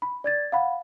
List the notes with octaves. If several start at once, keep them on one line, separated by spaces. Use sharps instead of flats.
B5
D5 G#6 A6
F5 F#5 B5